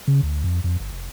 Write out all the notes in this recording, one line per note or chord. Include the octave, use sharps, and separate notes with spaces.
C#3
D2
F2
F2
G1
F1